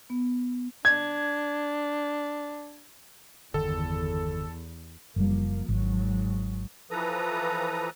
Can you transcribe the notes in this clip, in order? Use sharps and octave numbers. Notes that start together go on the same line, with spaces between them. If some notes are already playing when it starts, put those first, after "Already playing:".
B3
D4 G#6
G1 E2 D3 D#3 A4
F#1 F3 G3 A#3
G#1 G#2 F#3
E3 F3 A4 B4 A#5 D#6